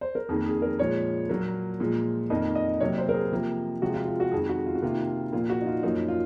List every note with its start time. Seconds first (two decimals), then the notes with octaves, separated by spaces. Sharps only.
0.01 C5
0.15 A#4
0.29 F2 D#3 A#3 G#4
0.46 G#4
0.62 A#4
0.79 A#2 F3 G#3 C#5
1.29 A#2 F#3 A#3
1.80 A#2 F3 G#3
2.30 F2 D#3 A#3 D#5
2.55 D#5
2.80 C3 F#3 A#3 C#5
2.98 C5
3.09 A#4
3.14 G#4
3.32 C3 F3 A#3
3.82 C3 F3 G#3 F#4
3.94 F4
4.06 F4
4.20 F#4
4.32 F2 D#3 G#3 G#4
4.49 F#4
4.66 F4
4.75 F#4
4.82 C3 D#3 A#3 F4
5.32 A#2 F3 A#3 F4
5.49 F#4
5.61 D#4
5.66 F4
5.83 F#2 F3 A#3 D#4
6.08 F4